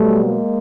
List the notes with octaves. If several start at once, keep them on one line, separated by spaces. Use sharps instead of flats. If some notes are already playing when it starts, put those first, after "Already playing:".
Already playing: B2 F#3 G3 A3
G#3 A#3